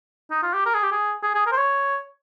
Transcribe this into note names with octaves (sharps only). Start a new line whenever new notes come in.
D#4
F4
G4
A#4
G#4
G4
G#4
G#4
G#4
A#4
C5
C#5